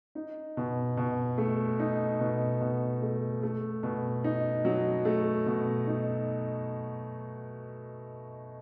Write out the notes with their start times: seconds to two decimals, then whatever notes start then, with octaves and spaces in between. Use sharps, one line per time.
0.15 D#4
0.57 B2
0.97 B2
1.38 A3
1.80 D#4
2.20 B2
2.61 B2
3.02 A3
3.43 A3
3.83 B2
4.24 D#4
4.65 F#3
5.05 A3
5.46 B2
5.87 D#4